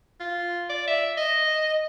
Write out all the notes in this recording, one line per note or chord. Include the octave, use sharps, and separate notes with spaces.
F4
D5
E5
D#5